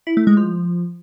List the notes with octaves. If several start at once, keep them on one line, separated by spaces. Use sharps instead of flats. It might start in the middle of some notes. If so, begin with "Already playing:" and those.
E4
A3
G#3
F3